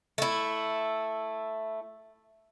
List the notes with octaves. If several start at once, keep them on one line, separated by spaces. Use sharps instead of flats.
A3 E4